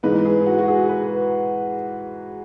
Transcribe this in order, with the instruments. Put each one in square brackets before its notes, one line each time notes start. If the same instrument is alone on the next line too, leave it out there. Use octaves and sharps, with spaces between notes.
[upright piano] G#2 E3 G#3 D#4 B4
G#4
F#4
F#4
G#4
B4